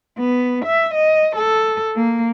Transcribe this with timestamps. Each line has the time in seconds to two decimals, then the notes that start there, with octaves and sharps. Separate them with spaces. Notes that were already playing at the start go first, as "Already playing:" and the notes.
0.18 B3
0.65 E5
0.94 D#5
1.36 A4
1.96 A#3